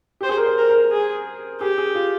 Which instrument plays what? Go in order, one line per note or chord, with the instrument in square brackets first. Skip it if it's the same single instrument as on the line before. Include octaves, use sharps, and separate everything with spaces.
[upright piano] G4 [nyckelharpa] C5
[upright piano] G#4
A#4
C5
[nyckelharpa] A#4
[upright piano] A#4
[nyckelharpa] G#4
[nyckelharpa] G4 [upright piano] G#4
[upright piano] G#4
F4